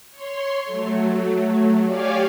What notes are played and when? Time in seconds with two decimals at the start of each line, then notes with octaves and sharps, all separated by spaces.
0.11 C#5 C6
0.64 F#3 A3
1.84 G4 C#5 D5 F5 G#5